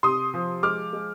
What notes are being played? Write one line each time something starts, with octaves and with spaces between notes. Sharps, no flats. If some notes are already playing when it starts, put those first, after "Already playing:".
C3 C6 D#6
F3
G#3 D6 F6
G#3